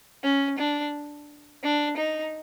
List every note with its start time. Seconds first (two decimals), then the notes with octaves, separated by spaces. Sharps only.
0.23 C#4
0.58 D4
1.63 D4
1.97 D#4